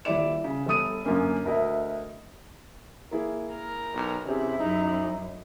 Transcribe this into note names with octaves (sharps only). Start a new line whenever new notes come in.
D#1 E4 D5 E7
C#3
G1 A4 D#6 D#7
F#2 D3 A#3 C#4
D2 A#4 D#5 E5
A#3 E4 G#4
A#4
B1
C3 C#4 E4 G4 G#4
F#2 D#4